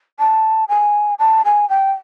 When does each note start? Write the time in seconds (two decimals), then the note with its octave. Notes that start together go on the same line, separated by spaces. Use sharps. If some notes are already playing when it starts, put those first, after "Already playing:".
0.19 A5
0.69 G#5
1.19 A5
1.45 G#5
1.70 G5